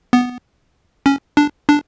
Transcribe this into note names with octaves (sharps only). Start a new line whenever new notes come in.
B3
C#4
D4
D4